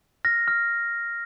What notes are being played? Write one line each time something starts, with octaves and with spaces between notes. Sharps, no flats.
F6 A#6
F6